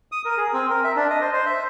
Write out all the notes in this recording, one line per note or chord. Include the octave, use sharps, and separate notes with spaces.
D#6
A#4
G#4
C4
A#4
E5
D4
D#5
C5
C5
E5